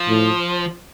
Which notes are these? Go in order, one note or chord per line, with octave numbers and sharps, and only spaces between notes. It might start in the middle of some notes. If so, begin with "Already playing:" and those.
Already playing: F3
A2